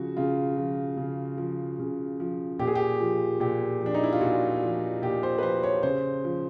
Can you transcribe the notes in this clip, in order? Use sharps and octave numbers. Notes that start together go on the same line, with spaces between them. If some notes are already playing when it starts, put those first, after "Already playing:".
Already playing: C#3 F3 F#4
C#3 F4
F3
C#3
F3
C#3
F3
A#2 G4
G#4
G4
F3
A#2 G4
F3
D4
D#4
E4
F4
A#2 F#4
F3
A#2 G4
C5
B4
F3 C5
C#5
C#3 C5
F3